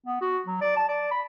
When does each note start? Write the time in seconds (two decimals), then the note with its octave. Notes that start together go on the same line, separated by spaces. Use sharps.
0.06 B3
0.21 F#4
0.46 F#3
0.61 D5
0.76 A5
0.89 D5
1.11 B5